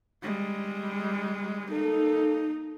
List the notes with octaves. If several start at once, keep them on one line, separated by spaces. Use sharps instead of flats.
G3 G#3
A#3 D#4 A4